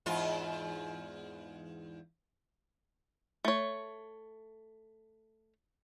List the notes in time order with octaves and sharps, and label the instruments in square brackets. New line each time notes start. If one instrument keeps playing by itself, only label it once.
[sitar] E2 G#2 F4
[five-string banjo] A3 C#5